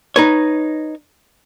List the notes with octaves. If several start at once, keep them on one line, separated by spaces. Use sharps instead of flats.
D#4 B4 C#5